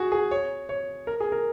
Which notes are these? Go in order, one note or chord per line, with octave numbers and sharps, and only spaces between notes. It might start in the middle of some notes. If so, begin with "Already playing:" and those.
Already playing: F#4 G#4
G#4
C#5
C#5
A#4
G#4
A#4